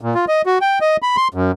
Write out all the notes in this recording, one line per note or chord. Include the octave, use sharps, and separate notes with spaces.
A#2
F4
D#5
F#4
G5
D#5
B5
C6
F#2